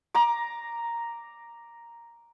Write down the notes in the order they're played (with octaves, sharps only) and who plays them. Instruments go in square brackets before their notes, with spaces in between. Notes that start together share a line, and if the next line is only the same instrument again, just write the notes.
[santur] A#5 D6